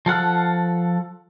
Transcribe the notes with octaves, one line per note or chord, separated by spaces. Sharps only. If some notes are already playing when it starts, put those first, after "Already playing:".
F3 A4 F#5 F6